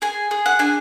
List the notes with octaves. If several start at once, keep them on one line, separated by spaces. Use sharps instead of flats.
G#4 G#5
G#4
F#5
D4 G#5